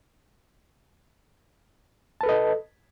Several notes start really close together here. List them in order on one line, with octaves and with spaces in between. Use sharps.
A5 B4 A4 D#5